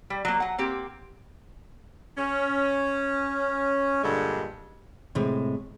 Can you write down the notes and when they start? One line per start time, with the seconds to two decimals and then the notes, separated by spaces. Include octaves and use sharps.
0.10 G3
0.25 F#3 A#3
0.40 F#3 F#5
0.58 A#3 C4 G4
2.18 C#4
4.03 G2 A#2 D3 G#3
5.15 A2 C3 G#3